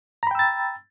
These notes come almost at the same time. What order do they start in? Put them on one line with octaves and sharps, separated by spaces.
A#5 B5 G5 E6 A6